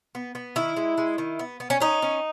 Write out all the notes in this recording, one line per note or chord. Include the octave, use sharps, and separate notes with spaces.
B3
B3
D#3 E4
G#3
G#3
D#3
B3
B3
C#4
C#4 D#4
C#4